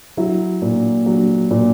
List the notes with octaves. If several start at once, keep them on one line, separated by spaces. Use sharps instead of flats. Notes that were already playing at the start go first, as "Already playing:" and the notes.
F#3 E4
A#2
F#3
A#2